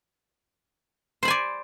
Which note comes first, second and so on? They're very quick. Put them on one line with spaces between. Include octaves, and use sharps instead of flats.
C5 B5 G#5 D5